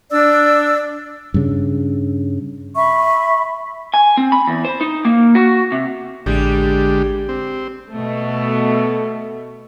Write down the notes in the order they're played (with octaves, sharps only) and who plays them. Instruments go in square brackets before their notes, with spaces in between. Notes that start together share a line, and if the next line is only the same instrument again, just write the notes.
[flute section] D4 D5 E6
[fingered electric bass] G2 C#3
[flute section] E5 B5 C#6
[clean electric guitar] G#5
C4
B5
E2
C5
D#4
A#3
F#4
C3
[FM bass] A1 [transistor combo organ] D3 G#3 G4 [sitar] G3
[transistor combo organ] C4
[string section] B2 A3